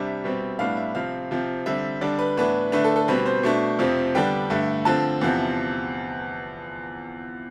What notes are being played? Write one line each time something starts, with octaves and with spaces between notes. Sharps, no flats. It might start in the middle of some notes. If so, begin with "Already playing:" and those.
Already playing: C3 G3 D4 E5
B2 G3 C4
A2 G3 B3 D4 F5
E5
C3 F3 C4 F5
C3 F3 C4
D3 G3 C4 E5
D3 G3 D4 D5
B4
A2 E3 B3 D4 B4
D3 A3 D4 B4
A4
A4
B2 G3 C4 B4
C5
B2 A3 D4
F2 C3 F3 C4
D3 G3 B3 D4 G5
G2 D3 A3
D3 F3 C4 A5
E2 C3 F3 C4